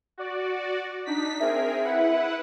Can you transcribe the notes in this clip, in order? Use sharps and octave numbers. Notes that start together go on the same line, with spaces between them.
F#4 D5
D4 D#4 B6
C4 G#4 A#4 E5
E4 B4 F#5